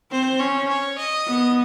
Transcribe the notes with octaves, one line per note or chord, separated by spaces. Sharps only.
C4 C5
C#4 C#5
C#5
D#5
B3